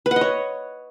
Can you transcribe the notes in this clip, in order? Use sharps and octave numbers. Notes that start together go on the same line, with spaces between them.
B4
F#5
D#5
C#5